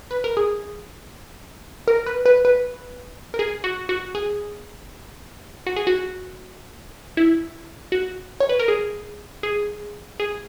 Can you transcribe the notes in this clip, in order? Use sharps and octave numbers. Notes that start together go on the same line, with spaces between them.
B4
A#4
G#4
A#4
B4
B4
B4
A#4
G#4
F#4
F#4
G#4
F#4
G#4
F#4
E4
F#4
C#5
B4
A#4
G#4
G#4
G#4